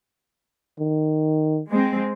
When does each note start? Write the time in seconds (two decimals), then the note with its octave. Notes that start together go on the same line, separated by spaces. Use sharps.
0.80 D#3
1.70 G#3 C4